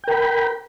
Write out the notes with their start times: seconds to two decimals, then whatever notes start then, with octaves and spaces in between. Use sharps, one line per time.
0.04 G5
0.07 A#4
0.11 B5